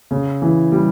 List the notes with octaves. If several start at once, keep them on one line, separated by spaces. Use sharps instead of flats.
C#3
E3
G3